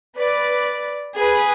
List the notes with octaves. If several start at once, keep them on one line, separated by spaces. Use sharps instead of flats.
B4 D5
G#4 B4